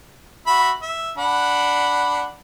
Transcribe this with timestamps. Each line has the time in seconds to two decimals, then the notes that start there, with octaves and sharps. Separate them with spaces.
0.47 F#4 E5 B5
0.82 E5
1.18 D4 F#5 B5